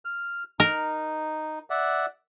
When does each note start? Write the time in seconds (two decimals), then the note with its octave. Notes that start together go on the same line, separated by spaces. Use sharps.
0.05 F6
0.60 D#4 A#4
1.70 D5 E5 F#5